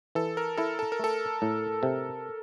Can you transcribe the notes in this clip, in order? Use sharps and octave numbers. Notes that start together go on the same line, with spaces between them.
E3 A4
A#4
E4 A4
A4
A#4
A3 A4
A2
C3